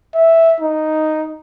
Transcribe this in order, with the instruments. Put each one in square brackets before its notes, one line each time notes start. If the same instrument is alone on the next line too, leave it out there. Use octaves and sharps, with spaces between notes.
[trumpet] E5
D#4